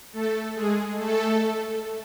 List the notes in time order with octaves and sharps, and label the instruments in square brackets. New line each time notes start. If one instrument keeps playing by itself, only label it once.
[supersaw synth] A3 A4
G#3 G#4
A3 A4